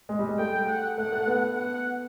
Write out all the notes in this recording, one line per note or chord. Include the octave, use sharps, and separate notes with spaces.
G#3
G3
G#3
A3 G5
F#5
A3 F#5
A3
B3
F#5